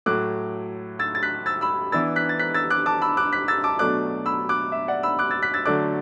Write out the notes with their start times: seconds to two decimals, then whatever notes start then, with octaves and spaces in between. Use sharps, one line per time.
0.06 A2 F#3 A3 D6 F#6
0.99 E6 A6
1.15 A6
1.23 F#6 B6
1.46 E6 A6
1.61 B5 E6
1.92 E3 B3 D4 E6 A6
2.16 F#6 B6
2.29 A6
2.39 F#6 B6
2.54 E6 A6
2.70 D6 F#6
2.86 A5 D6
3.02 B5 E6
3.17 D6 F#6
3.33 F#6 B6
3.48 E6 A6
3.64 A5 D6
3.79 B2 F#3 A3 D4 D6 F#6
4.26 B5 E6
4.49 D6 F#6
4.72 E5
4.88 D5 F#5
5.03 B5 E6
5.19 D6 F#6
5.31 E6 A6
5.42 F#6 B6
5.54 E6 A6
5.65 D3 F#3 A3 D4 D6 F#6